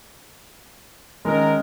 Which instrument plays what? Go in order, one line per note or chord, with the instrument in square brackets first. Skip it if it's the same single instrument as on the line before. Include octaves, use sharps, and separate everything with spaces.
[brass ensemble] D#3 A#4 [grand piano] G#3 C#4